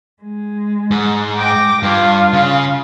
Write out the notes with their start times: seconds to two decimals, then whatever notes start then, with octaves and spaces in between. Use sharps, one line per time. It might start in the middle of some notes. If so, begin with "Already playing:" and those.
0.22 G#3
0.91 G#2
1.38 G5 D6 A#6
1.83 G2 F4
2.33 C#3